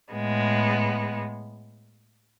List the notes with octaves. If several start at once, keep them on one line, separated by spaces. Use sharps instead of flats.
A2 G#3 B3